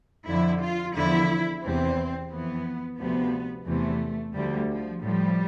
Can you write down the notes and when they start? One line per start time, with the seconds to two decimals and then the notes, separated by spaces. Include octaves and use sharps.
0.28 F2 D3 F3 E4
0.63 F4
0.96 E2 D3 F3 E4
1.63 E2 C3 E3 C4
2.31 F2 E3 B3
2.99 D2 C3 F3 B3
3.67 E2 C3 E3 A3
4.34 D2 D3 F3 G3
4.68 F3
5.02 A2 F3 G3